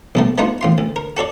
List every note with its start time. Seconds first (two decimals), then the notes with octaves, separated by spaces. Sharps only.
0.15 A#1 B2 A3
0.38 A3 B3 D#4 F4 F#4
0.61 A1 F4 C6
0.78 D2
0.96 A#4
1.17 F#4 A4 C#5 D5